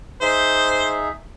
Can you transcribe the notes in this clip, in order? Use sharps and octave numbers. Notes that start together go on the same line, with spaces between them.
D#4 G#4 C5 E5